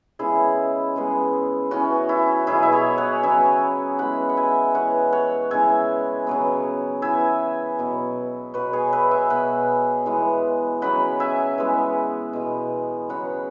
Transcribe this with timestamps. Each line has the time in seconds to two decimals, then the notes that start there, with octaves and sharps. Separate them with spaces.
0.19 C#3 G#3 B3 E4 G#4
0.96 C#3 G#3 B3
1.71 E3 B3 C#4 F#4
2.09 E4
2.47 B2 F#3 B3 E4 G#4
2.63 E5
2.72 G#4 C#5
2.98 C#5 F#5
3.23 C#3 F#3 B3 E5 G#5
3.99 E3 G#3 B3 F#5 B5
4.29 F#5
4.37 E5 G#5
4.75 E3 B3 C#5 F#5
5.12 C#5 F#5
5.51 C#3 E3 G#3 B3 E5 G#5
6.27 C#3 F#3 B3
7.02 E3 B3 E5 G#5
7.79 B2 F#3 B3
8.54 B2 F#3 B3 F#4 B4
8.73 G#4 C#5
8.93 B4 E5
9.11 E5 G#5
9.30 B2 B3 F#5 B5
10.06 E3 G#3 B3
10.82 C#3 F#3 B3 F#5 B5
11.20 E5 G#5
11.58 E3 G#3 B3
12.33 B2 G#3 B3
13.09 C#3 F#3 B3 F#5 B5